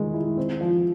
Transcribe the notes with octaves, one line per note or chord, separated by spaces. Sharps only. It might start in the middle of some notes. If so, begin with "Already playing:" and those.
Already playing: D#3 G#3
E4
C4
F3